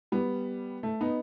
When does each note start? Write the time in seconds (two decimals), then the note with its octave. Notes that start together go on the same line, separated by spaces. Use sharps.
0.12 G3 B3
0.83 A3
1.01 B3 D#4